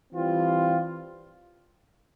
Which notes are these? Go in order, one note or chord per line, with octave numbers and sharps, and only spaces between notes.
E3 G3 C4 F4